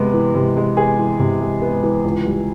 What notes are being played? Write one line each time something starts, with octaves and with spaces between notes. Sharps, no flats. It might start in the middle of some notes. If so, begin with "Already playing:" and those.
Already playing: C3 G#3 B3
E3
C3
G#3
B3 G#4
E3
C3
G#3
B3
E3
C#2
G3